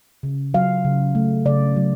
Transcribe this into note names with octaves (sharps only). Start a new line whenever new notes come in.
C#3
F#3 F5
C#3
A3
C#3 D5
F#3